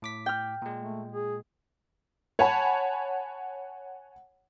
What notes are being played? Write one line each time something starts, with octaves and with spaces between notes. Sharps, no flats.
A2 D6 B6
G5 F6
A#2 G#3
A3
G#4
C#5 F#5 G#5 A5 B5